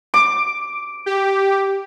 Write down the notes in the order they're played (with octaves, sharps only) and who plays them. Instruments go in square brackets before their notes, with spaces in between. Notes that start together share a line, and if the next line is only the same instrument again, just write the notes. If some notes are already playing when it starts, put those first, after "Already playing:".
[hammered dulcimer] D6
[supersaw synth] G4